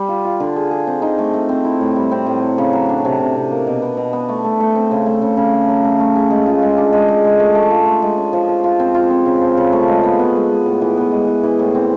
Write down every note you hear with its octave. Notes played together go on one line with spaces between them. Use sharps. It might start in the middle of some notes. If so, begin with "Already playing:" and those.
Already playing: G3
F4
F4
D3
G#4
G#4
C4
D#4
A3
A3
C4
E4
A2
G3
C4
A2
F#3
C#3
F#3
D4
C3
C3
C3
A#3
B2
B3
B2
B3
A3
A3
A3
C4
C#3
A3
C#3
C#3
A3
F#3
A3
A3
G#4
G#3
F4
G#3
D4
G#3
G#3
G#3
A3
A3
F4
A3
G#3
C#4
F3
F3
F4
C4
F4
C4
C#3
F3
C#3
A3
G#3
B3
B3
G#3
G#3
A2
E3
B3
G#3
E3
E3
A2
C4